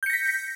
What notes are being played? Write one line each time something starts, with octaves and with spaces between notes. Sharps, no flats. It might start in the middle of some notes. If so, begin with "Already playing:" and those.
G6 A#6 B6 C#7